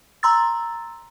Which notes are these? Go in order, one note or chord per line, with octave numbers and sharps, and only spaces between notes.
A#5 C6 E6 A6